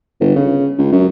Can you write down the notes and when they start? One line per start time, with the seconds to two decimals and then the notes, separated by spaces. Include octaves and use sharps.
0.20 G1
0.36 C#3
0.78 C#2
0.93 F#2